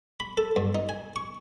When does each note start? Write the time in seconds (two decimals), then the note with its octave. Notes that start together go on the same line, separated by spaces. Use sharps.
0.20 B5
0.37 A4
0.56 G2
0.75 D#4
0.89 G#5
1.16 C#6